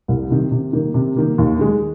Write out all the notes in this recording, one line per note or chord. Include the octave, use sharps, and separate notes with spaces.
C2
C3 D#3
C3
D#3 A#3
C3
D#3 A#3
D#2
D#3 G#3